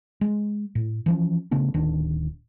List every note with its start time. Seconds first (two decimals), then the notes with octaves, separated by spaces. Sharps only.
0.21 G#3
0.75 A2
1.06 E3 F3 C#4
1.51 C#3 A3 B3 D4
1.74 D1 D#3 D4